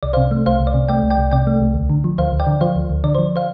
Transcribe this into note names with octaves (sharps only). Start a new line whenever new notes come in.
C2 D5
C5 F5
C3
A3
C2 C5 F5
C2
D5
C3
A3 D5 G5
C2
D5 G5
C2
C3 D5 G5
A3
C2
D2
D3
F3
D2 C5 F5
D2
D5 G5
D3
F3 C5 F5
D2
D2
D3 D5
C5
F3
C5 F5